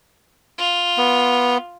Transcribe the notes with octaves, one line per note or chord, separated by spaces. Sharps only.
F4
B3